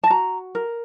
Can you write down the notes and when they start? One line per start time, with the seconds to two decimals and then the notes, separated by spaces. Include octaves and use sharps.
0.04 A5
0.10 F#4 A#5
0.55 A#4